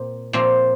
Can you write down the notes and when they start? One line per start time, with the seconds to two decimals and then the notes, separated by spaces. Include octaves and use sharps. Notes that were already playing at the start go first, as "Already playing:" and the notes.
Already playing: A#2 C4
0.33 A#2 F3 C4 F4